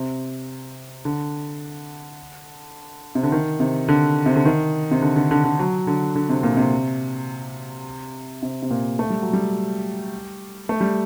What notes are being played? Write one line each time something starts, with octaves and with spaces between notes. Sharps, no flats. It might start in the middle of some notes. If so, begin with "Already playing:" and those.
Already playing: C3
D3
C3
D3
D#3
C3
D3
C3
D3
D#3
C3
D3
D3
D3
D3
F#3
D3
D3
C3
A#2
C3
C3
C3
A#2
A3
G3
F#3
G3
A3
G3